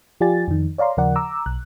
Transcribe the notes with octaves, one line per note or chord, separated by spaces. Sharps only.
F3 F4 G4 D5 G#5 A6
F2 D#3
C#5 D5 F5 A#5 C6
D#2 C#3 F3 A#4 D5 F#5
A#5 D6 E6
B1 F#6